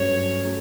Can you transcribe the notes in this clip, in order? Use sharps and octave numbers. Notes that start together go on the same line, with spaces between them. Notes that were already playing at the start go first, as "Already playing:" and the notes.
Already playing: G2 F#3 A3 C#4 C#5
F#3 A3 C#4